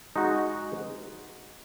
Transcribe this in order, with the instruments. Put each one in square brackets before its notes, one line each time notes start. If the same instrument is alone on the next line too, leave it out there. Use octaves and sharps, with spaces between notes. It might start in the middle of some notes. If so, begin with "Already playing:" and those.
[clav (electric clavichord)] G#3 D#4 F#4